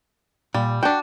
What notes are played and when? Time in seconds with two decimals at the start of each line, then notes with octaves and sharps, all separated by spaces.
0.54 A#2 G3
0.83 D4 F#4 G5